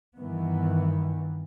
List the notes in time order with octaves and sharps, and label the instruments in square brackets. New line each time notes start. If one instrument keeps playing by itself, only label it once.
[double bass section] G2 D#3 E3 B3